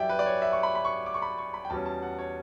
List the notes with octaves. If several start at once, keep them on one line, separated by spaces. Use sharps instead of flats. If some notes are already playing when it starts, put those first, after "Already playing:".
Already playing: F#2 E3 G3 D5 E5 G5
B4
D5
C#5
E5
C#6
B5
B5
C#6
D6
C#6
B5
C#6
B5
G5
E2 B2 G3 C#4 A5
A5
F#5
C#5